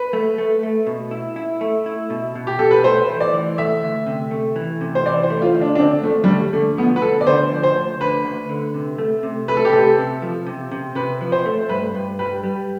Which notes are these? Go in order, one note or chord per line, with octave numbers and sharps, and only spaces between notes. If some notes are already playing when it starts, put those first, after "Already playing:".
Already playing: B4
A3
A3
A3
B2
E4
E4
A3
E4
B2
B2
G4
B2 A4
B4
A3 C5
E3
D5
E3
A3 E5
D2
C3
A3
E3
C3
C5
E3 D5
C5
A3
F4
D2
D4
D4
D2 C4
D2 A3
G3
D2 A3
D3 A3
F3 B3
B4
D2 A4
D5
D3 C5
F3
C5
D2
D3 B4
D2
D3
C3
A3
C3
A3 B4
A4
G4
C3 A4
C3
F3
C3
C3
C3 B4
F3
C5
A3
G2 B4
G2
G3 B4
G3